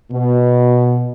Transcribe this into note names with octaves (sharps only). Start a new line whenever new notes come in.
B2